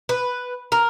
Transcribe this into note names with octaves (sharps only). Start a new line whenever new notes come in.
B4
A#4